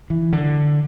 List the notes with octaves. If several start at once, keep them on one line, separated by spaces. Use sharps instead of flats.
E3
D3